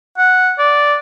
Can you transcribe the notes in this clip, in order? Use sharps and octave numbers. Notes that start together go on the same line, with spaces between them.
F#5
D5